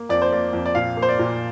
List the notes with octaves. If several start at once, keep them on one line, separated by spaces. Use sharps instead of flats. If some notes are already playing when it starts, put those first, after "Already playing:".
Already playing: A#3
F2 D5
C5
A#3 D5
F2
D5
A#2 F5
A#3
C5
D5
A#2